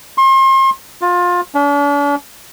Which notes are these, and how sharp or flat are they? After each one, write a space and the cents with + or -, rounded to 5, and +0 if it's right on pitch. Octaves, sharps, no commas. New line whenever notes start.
C6 +40
F4 +25
D4 -45